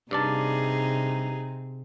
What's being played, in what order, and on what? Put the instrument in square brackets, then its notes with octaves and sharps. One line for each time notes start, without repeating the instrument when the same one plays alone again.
[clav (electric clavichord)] G2 D5 A5 [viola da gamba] C3 [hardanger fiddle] D#4 G#4